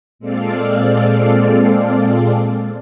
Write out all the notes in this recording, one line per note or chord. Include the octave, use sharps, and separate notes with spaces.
A#2 G#3 C4 A4 D5 F5